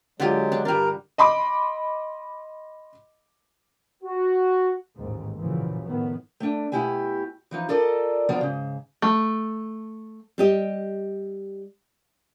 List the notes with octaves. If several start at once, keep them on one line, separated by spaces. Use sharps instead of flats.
D3 F#3 G#3 F4 G4
D4
G2 G3 D4 A#4 A#5
D#5 B5 C6 D6
F#4
A1 D#2 G#2
F#2 A#2 C#3 E3 F3
A2 D#3 B3
A3 D4
B2 A3 E4 G4 G#5
E3 F3 D#4
F4 A4 A#4 D5 D#5
D3 F3 F#3 B3 F4 D5
G#2 C#3
A3
G3 G4 D#5